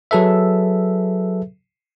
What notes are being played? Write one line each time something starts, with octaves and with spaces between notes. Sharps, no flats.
F#3 G#4 A4 B4 E5